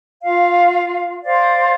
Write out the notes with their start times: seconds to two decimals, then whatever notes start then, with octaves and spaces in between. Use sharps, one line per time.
0.24 F4 F5
1.24 C5 D5 F5